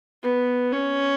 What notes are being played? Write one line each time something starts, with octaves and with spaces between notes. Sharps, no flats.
B3
C#4